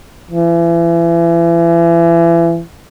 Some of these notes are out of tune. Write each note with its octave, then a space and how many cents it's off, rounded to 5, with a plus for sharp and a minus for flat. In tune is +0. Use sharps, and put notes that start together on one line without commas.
E3 +35